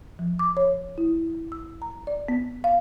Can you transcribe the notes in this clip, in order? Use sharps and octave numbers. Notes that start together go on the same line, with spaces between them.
F3
D6
C#5
E4
E6
A#5
D5
B3
F5